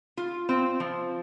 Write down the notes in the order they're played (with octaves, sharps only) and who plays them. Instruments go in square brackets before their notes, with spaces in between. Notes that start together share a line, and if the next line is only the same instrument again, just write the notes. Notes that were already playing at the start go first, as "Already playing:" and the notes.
[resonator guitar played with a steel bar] F4
C4
F3